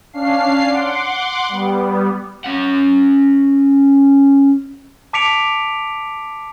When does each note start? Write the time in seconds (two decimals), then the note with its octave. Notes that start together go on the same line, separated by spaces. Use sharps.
0.13 C#4 D4 F5 C7
0.69 F#5 C6 D6
1.49 G3 B3
2.44 C#4 F#5
5.13 A5 D6 B6 C#7 D7 F7